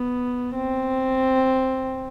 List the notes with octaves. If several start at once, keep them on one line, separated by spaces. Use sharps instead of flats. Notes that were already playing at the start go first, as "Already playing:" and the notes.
Already playing: B3
C4